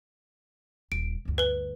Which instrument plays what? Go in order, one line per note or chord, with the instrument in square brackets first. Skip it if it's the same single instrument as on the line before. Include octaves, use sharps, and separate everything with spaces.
[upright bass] D#1 [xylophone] D7
[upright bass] G1 D2
[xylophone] B4 G7